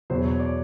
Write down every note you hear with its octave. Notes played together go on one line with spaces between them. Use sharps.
E2 B2 F#3 C5
C#5
D5